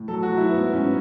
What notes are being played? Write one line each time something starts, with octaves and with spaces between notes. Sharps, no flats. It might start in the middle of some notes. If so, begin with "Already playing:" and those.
Already playing: A2
F#3 A4
F#4
F#3
E4
G#2 B3
G#2 C#4